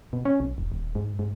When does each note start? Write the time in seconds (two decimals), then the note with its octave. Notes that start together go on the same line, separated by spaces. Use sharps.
0.13 B2
0.25 C#4
0.40 B1
0.58 E1
0.72 D#1
0.95 G#2
1.19 G#2